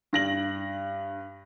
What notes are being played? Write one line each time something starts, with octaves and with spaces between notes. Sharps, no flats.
G2 A#6 F#7